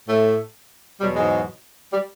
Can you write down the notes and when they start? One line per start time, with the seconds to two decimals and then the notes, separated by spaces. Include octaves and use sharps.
0.09 A2 A3
1.00 E2 B2 F#3 G3
1.16 G#2 G#3
1.92 G3